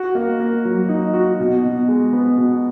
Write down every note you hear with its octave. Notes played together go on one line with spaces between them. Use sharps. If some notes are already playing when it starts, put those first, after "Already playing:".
Already playing: F#4
A#3
A#3
F#3
D#4
F#4
B2
B2
G#3
B3
B2